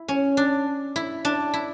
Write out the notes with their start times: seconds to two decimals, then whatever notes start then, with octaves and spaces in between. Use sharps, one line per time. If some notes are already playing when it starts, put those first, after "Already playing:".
Already playing: E4
0.08 C#4
0.37 D4
0.96 E4
1.25 D4
1.54 E4